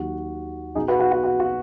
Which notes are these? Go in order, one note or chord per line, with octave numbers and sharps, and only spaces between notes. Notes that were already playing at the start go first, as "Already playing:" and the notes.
Already playing: D#2 D#3 F#3 F#4
B1 B2 F#3 D#4 G#4
F#4 B4
F#4
F#4
F#4
F#4